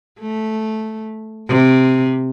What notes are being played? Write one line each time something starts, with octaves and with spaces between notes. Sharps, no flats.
A3
C3